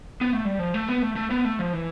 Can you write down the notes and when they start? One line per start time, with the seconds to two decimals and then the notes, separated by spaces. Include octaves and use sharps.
0.21 B3
0.33 A3
0.45 G3
0.59 F3
0.74 A3
0.88 B3
1.02 A3
1.16 A3
1.30 B3
1.45 A3
1.59 F3
1.73 E3